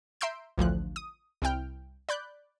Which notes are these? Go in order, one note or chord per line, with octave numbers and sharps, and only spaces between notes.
E5 A#5 C6 E6 G6 D7
A1 D2 F3 F#6
D#6
C2 C4 E4 G5 F6
D5 B5 F#6 G6